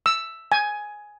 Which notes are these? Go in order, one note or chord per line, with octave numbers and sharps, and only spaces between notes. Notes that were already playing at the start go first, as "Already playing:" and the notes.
E6
G#5